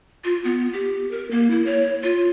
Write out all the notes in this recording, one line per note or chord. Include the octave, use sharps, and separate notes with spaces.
F4
B3
G4
A#4
A#3
E4
C#5
F4